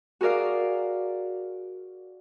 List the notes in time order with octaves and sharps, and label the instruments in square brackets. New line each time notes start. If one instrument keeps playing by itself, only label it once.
[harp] F#4 G#4 A#4 D5 F5